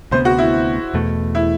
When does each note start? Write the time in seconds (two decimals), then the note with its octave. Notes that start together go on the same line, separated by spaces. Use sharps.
0.11 D2 C3 G3 B3 C5
0.25 F#4
0.38 E4
0.94 E2 B2 A3
1.35 E4